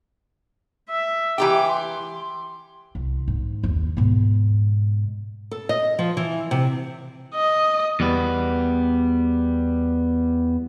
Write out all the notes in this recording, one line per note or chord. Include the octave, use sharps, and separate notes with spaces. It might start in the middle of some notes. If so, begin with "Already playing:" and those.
E5
E3 G4 G5 D6
C6
C2
G#2
F#1 D#2
G#2 B2
A4
D#5
F3
E3
C3
D#5
E2 G3 B3